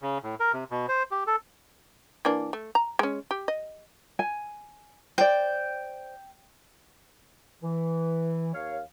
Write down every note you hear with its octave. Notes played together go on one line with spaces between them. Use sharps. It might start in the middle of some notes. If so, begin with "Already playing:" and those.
C#3
A2
A#4
C3
B2
C5
G4
A4
E3 A#3 D4
A3
A#5
G#3 C#4
G4
D#5
G#5
C5 D5 G5
E3
D#2 C#5 F5